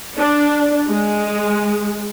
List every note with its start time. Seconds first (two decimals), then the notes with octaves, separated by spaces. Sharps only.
0.17 D4
0.89 G#3